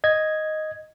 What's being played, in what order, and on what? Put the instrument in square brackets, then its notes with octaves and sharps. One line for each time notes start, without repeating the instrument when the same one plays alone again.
[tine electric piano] D#5 G#6